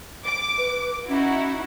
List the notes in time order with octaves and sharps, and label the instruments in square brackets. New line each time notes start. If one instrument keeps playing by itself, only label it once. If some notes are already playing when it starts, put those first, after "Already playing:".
[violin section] D6
[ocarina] B4
[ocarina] C#4 [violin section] D#4 E4 F#4